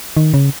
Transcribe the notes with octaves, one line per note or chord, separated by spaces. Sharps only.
D#3
C#3